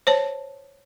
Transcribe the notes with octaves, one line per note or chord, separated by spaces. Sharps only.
C5 C#5 A5